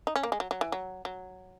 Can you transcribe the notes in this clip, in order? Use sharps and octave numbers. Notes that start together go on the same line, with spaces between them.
D#4
C#4
A#3
G#3
F#3
F#3
E3
F#3
F#3